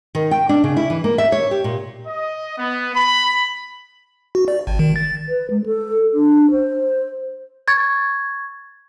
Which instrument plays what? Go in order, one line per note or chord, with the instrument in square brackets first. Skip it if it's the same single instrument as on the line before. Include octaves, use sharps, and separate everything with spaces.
[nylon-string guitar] D#3
G5
D4
C#3
E4
E3
A#3
E5
C#5
G4
A#2
[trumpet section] D#5
B3
B5
[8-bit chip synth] F#4
D5
G#1
D#3
A6
[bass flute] B4
G#3
A4
D4
C5
[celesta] C#6 G#6 A6